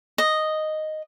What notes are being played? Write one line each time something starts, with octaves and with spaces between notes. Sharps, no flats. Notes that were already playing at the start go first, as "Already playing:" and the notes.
D#5